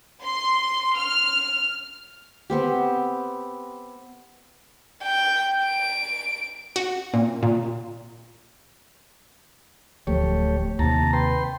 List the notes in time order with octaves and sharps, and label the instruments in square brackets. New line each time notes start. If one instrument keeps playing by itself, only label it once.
[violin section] C6
F6
[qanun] B3 C4 G4
[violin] G5
D7
[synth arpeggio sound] F#4
A#2
A#2
[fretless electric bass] D1 F3 [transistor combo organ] A3 G4 C#5
[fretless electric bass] D#2 C3 [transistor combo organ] A5 A#5
[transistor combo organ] B4 G5 C6